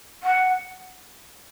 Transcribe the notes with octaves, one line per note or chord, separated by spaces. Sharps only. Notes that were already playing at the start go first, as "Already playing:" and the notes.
F#5